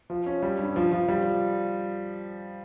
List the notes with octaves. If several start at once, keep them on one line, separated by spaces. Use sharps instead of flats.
F3
C#4
G3
G2
F3
F3
G3